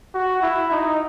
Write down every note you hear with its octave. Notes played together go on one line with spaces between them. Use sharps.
F#4
E4
D#4